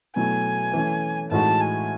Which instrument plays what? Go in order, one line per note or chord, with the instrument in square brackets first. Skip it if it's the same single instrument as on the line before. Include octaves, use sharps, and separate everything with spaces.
[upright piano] B2 F#3 A3 E4 [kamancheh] G#5
[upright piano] E3 A3 C#4
[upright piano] A2 E3 G#3 D#4 F#4 [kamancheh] A5
[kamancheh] G#5